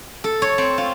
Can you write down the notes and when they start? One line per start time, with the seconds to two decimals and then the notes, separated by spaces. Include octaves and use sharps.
0.24 A4
0.42 C#5
0.58 C4
0.78 F4